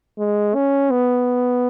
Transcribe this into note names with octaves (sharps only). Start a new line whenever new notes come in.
G#3
C#4
B3